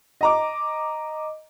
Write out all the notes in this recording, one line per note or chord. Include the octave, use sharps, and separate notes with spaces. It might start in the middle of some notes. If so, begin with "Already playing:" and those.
D#5 A#5 D6